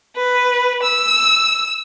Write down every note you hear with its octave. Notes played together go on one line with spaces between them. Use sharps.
B4
E6